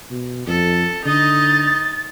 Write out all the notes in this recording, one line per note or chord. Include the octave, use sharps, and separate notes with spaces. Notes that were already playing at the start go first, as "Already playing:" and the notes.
B2
F2 A4
D3 D#4 D#5 A6